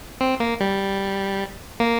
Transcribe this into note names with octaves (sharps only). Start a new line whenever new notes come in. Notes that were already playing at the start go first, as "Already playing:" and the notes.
C4
A#3
G3
A#3